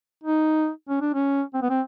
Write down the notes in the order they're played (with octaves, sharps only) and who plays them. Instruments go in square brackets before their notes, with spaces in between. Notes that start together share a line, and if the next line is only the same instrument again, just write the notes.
[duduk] D#4
C#4
D4
C#4
C4
B3
C4